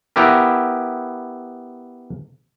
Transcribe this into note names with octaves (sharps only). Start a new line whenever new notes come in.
B3 E4 G4 A#4